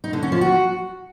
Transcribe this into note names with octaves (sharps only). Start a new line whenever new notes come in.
D#4
D3
C#4
F3
F#4